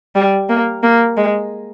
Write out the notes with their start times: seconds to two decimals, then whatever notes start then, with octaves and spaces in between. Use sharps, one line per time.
0.15 G3
0.49 A#3
0.83 A#3
1.17 G#3